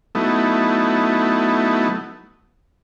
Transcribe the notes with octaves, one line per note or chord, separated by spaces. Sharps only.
F#3 A3 B3 D#4 E4